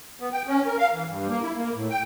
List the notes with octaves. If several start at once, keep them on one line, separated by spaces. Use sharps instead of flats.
B3
G5
C#4
A#4
F5
E3
G2
A#3
E4
A#3
A2
G5